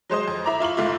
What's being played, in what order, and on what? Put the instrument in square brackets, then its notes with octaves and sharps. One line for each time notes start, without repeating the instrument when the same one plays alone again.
[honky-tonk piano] F#3 G#3 C5 D#5
F2
E4 A#5 D6
E4 F4 C#6 F#7
F1 G#2 E4 F4